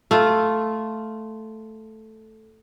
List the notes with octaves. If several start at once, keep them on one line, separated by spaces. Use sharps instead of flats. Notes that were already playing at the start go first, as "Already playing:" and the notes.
A3 F4